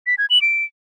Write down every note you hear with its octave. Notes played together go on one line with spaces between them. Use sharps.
B6
G#6
F#7
D7